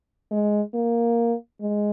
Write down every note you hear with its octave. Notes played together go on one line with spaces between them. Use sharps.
G#3
A#3
G#3